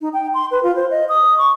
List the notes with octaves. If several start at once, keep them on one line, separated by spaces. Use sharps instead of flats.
D#4
G5
C6
B4
F4
C5
D#5
D#6
C#6